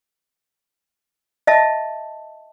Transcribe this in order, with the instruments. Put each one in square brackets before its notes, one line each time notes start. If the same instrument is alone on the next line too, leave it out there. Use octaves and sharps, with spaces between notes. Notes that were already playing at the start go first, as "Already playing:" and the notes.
[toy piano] D#5 E5 A5